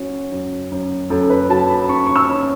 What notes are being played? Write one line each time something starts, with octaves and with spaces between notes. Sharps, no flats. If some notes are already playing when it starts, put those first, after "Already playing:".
Already playing: F#3 C#4 F#4
F#2
F#2
F#2 A4
B4
F#3 A5
B5
C#4 C#6
C#6
E6
C#4